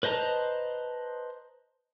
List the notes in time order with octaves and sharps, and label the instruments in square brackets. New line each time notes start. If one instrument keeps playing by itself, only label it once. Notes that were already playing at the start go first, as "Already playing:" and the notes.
[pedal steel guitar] B4 C5 D#5 A5 A#5